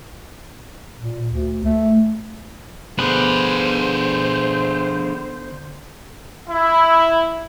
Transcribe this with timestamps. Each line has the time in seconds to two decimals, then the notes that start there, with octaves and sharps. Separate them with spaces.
1.00 A#2
1.29 D2
1.65 A3
2.99 D3 B3 D4 G#4 B4 C5
6.50 E4